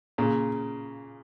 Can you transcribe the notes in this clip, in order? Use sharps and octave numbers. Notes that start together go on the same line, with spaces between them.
A#2 C#3